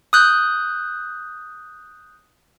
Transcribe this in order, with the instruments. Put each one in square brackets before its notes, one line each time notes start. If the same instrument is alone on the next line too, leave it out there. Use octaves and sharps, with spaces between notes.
[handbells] D#6 F#6 G6